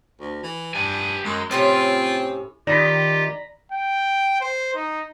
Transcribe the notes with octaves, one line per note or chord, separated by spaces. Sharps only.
D2
E3
G2 G4 G#5
F#2 G#3
A2 C3 C4 C#4 F4
D#3 F4 G4 D5 A#5 B5
G5
C5
D#4